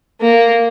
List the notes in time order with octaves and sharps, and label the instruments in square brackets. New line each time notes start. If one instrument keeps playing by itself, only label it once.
[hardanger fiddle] A#3